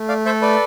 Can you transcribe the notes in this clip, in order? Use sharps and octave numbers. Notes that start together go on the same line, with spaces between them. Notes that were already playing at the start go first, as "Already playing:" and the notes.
Already playing: A3
D5 F5
A4 C5 E5
B4 D5